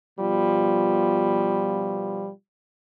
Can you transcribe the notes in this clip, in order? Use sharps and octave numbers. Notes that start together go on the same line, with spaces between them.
B2 F3 G3 B3 F4